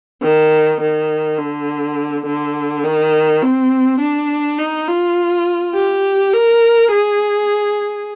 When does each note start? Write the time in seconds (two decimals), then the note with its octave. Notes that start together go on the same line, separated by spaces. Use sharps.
0.22 D#3
0.81 D#3
1.38 D3
2.26 D3
2.84 D#3
3.42 C4
4.00 D4
4.58 D#4
4.88 F4
5.74 G4
6.33 A#4
6.91 G#4